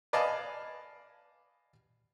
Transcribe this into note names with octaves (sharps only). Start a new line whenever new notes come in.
B4 D5 D#5 F5 G#5 A5